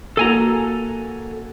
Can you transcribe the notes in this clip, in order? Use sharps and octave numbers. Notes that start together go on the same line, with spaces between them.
A#3 F#4 A4 G#5 A#5